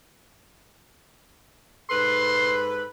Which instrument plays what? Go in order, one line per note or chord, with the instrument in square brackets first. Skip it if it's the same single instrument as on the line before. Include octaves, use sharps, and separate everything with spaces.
[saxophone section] G#2 A4 B4 [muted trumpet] C6